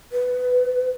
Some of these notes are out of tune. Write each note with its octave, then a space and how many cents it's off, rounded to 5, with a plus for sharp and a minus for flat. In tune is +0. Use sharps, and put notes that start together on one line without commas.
B4 +15